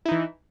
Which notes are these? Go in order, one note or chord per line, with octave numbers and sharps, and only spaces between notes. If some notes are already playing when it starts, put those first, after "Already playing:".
E3 D#4 E4